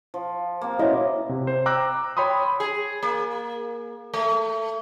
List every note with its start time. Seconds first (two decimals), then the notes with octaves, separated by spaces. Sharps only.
0.14 F3
0.61 A#3 C4
0.79 B2 C#4 E4 D#5
1.29 C3
1.47 C5
1.66 G5 A#5 D6 E6 F#6 A#6
2.17 C#5 G5 B5 C6 D#6
2.60 G#4
3.03 A#3
4.14 A3